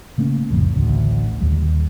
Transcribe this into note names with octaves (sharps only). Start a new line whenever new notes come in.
C#3 A3 A#3 C#4
F#1 C2 F2 A2
A1 D2 C#3
D#1 D#2 G3